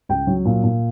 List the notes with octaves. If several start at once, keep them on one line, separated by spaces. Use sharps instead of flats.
C#2 G5
F#3
A#2
A#2